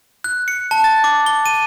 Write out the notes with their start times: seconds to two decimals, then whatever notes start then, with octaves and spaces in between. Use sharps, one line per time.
0.24 F#6
0.48 C#7
0.71 A5
0.84 A6
1.04 D6
1.26 G7
1.46 D#7